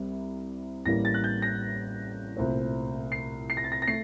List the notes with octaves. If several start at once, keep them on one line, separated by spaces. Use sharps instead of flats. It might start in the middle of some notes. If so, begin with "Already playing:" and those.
Already playing: C2 C3 G3
A1 A2 G3 A#3 A#6
A6
F#6
G6
A#6
C2 A#2 A3 C4
C7
C7
A#6
A6
A#6
A#6
A3 C7